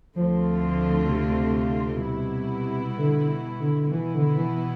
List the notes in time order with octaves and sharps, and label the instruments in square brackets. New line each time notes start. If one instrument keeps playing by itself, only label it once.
[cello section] D2 D3 A3 C4 F4 [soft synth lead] F3
[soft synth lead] C3
[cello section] B2 G3 B3 E4
[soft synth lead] D3
D3
[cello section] B2 B3 E4 [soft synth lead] E3
[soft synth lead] D3
E3